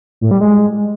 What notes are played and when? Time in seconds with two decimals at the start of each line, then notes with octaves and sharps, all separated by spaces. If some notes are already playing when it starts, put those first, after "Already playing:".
0.21 A2
0.31 G3
0.41 G#3